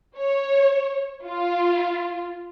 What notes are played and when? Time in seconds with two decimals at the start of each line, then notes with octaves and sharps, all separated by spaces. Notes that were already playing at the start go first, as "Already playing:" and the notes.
0.18 C#5
1.27 F4